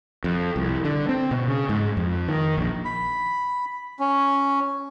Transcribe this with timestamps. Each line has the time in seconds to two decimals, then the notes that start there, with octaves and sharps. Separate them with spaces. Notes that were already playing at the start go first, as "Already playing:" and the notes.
0.24 F2
0.56 C2
0.85 D3
1.09 C4
1.31 B2
1.48 C#3
1.69 G#2
1.97 F2
2.28 D#3
2.57 A#1
2.85 B5
3.99 C#4